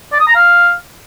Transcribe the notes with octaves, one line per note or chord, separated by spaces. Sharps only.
D5
D#6
A#5
F5